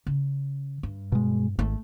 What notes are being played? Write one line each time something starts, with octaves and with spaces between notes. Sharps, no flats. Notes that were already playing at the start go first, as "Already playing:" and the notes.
C#3
G2
B2 G#3
G#1 A3